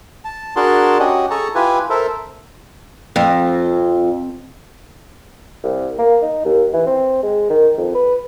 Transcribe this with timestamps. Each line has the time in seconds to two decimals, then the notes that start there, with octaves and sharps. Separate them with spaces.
0.25 A5
0.56 D4 F#4 G#4 A#4 A5 C6
1.00 C#4 F#4 G4 D#5
1.30 G#4 A4 A5 A#5 C#6
1.55 E4 F4 G4 B4 G#5
1.90 A4 A#4 C5 E5
3.16 F2
5.63 C2
5.99 A#3
6.22 D#4
6.45 D#2
6.73 E3
6.87 C4
7.23 G#3
7.50 D#3
7.78 F2
7.95 B4